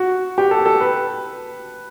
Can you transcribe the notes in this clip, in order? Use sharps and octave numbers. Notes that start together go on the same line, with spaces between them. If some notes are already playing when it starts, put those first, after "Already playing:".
Already playing: F#4
G4
A4
A4
B4